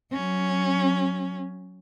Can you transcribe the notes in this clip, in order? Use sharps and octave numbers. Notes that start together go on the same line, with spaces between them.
F#3 C#4